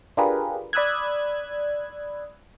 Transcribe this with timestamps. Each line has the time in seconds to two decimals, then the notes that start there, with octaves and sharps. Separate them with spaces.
0.17 D4 F4 G4 G#4 A#4 B4
0.73 D5 B5 D#6 E6 F#6 G#6